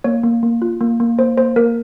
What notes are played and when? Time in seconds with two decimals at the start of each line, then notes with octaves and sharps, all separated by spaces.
0.04 A#3 C#5
0.23 A#3
0.43 A#3
0.62 F4
0.81 A#3
1.00 A#3
1.18 A#3 C5
1.38 A#3 C5
1.56 A#3 A#4